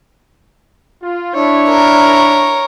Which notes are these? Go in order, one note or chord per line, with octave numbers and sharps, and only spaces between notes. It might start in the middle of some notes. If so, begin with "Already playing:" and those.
F4
D4 E4 C#5
A#4